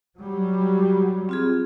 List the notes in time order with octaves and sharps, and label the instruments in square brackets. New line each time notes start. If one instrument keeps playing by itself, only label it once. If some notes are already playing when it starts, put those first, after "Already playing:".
[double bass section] F#3 G3
[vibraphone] C4 F4 G#4